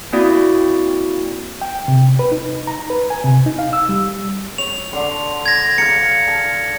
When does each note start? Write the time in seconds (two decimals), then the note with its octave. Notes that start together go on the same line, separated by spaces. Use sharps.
0.13 A#3 C4 E4 F#4 D5 D#6
1.61 G5
1.88 C3
2.19 B4
2.32 D#4
2.67 A#5
2.90 B4
3.10 G#5
3.24 C3
3.46 D#4
3.59 F5
3.73 E6
3.89 G3
4.58 C#5 F7
4.93 D3 C6
5.46 G#6 A#6
5.78 F5 A#5 C#7
6.28 A5